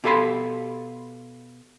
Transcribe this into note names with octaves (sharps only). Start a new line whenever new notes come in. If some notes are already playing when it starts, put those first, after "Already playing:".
B2 G4 A4 F5 B5 C6